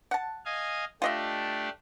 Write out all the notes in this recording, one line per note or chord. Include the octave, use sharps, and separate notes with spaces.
F#5 A5
D#5 F5 G#5
A3 D4 F4 G4 D#5 E5